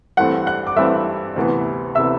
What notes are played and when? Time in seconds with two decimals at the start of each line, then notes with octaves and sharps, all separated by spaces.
0.17 G2 E3 A3 C4 F#5 F#6
0.47 F#5 F#6
0.67 D6
0.76 G2 E3 A3 C4 E5 E6
1.36 D2 C3 E3 B3
1.95 C3 E3 B3 E5 E6